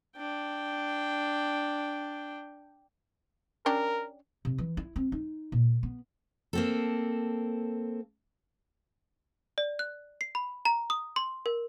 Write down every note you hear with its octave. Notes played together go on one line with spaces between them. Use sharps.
D4 G5
C#4 D4 G4 A#4
C3
E3
E4
C4
D#4
A#2
B3
A#3 C4 A4
D5
F#6
C7
B5
A#5
D#6
C6
A#4